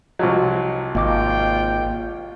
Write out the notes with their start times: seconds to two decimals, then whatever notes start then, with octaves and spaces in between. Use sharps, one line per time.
0.19 C2 F3 F#3 D#5
0.95 G#1 A#3 F4 D#5 G5 D6